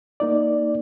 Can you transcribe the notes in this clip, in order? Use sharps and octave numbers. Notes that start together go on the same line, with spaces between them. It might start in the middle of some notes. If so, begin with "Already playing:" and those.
A#3 D#4 D5